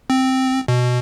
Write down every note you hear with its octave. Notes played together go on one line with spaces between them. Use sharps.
C4
B2